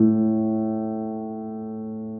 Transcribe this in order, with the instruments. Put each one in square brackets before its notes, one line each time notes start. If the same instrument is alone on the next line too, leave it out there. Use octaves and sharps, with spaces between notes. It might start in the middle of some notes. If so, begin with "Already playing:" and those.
Already playing: [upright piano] A2